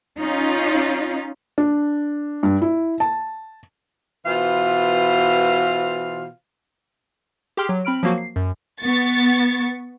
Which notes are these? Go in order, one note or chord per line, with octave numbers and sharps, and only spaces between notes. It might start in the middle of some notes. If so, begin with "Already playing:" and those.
C#4 D#4 F4
D4
G2
E4
A5
B2 E3 F4 C5 F5
G4 G#4 G5 C6 F6
F#3
C4 B5 F6 D7
F3 F#3 A#3 F#4
C7
F#2
B3 C#6 A6